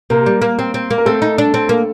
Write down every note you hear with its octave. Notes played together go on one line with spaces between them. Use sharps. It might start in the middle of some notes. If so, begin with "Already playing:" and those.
C3 A#3 A#4
G3
A#3
C4
C4
A#3
A#4
A3 C4 A4
D#4
D4
C4
A#3